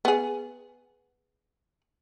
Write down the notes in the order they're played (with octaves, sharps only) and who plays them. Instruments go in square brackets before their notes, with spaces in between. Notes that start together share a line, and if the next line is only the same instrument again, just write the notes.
[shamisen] B3 G#4